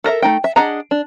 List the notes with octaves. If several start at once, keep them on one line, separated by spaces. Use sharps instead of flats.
A4 A#4 D#5 E5
A3 D#4 G5
E5
D4 G#4 D#5 F#5 A#5
D4